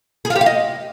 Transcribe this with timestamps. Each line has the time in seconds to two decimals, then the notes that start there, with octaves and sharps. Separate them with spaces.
0.25 G#4
0.30 F4
0.36 G4
0.41 F5
0.46 D#5